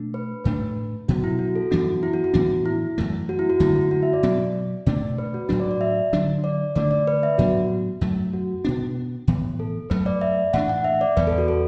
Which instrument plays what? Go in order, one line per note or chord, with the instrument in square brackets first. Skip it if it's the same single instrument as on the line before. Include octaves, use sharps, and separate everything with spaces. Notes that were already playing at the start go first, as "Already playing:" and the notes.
Already playing: [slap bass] B2 A3 D4
[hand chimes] B4
[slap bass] A2 A3 D4 [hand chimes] B4
[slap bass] B2 F#3 B3 [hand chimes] F#4
[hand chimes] E4
F#4
A4
[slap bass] F#2 E3 B3 D4 [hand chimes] F#4
[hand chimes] E4
F#4
F#4
[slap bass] A2 E3 B3 D4
[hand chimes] E4
[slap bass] F#2 E3 A3
[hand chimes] F#4
E4
F#4
[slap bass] F#2 D3 A3 [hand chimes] E4
[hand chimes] E4
F#4
E5
D5
[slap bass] B2 F#3 B3
[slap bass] B2 A3 D4 [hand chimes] D5
[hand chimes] B4
F#4
[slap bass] A2 F#3 D4 [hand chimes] F#4
[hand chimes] D5
D5
E5
[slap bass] D3 F#3 D4
[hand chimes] D5
[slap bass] D3 A3 D4 [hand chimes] D5
[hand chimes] D5
B4
E5
[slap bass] A2 F#3 B3 D4 [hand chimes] F#4
[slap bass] F#2 F#3 A3
[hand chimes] F#4
[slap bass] B2 B3 D4
A2 E3 B3
[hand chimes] A4
[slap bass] F#2 F#3 A3 [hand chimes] B4
[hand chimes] D5
E5
[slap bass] A2 E3 D4 [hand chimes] F#5
[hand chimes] F#5
E5
D5
[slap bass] E2 E3 B3 [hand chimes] B4
[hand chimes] A4
F#4
A4